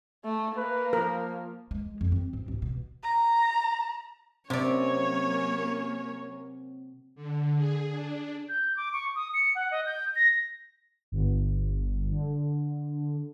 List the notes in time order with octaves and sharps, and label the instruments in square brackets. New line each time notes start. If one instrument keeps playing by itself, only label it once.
[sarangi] A3
[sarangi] A#3 [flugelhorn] B4
[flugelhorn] F3 [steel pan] A#4
[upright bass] G#3
F2
C4
G#2
C2
B2
[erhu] A#5
[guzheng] C3 D5 [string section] F#3 A#3 C#4 [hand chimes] C4 [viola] C#5
[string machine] D3
G#4
D4
[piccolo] G6
D6
C#6
D#6
C#7
F#5
D#5
G6
A#6
[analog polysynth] G1
D3